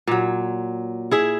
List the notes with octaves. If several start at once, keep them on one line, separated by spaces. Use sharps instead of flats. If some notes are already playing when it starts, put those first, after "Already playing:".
A#2 F#3
E4 G#4 E5